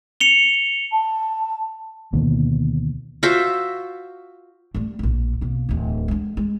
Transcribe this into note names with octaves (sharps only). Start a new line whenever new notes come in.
C#7 F7 G7
A5
D2 B2 D#3 A#3
F4 F#4 C5 E5
G3 A3
A#1 A#3
B1 A#3
D1 E2
G#3 D4
G#3